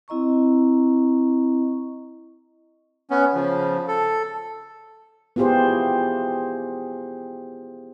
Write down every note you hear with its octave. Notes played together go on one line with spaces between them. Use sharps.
C4 E4 D#5 A#5 C#6
B3 C#4
C#3 F3
A4
B3 E4 F4 G4 G#4 C5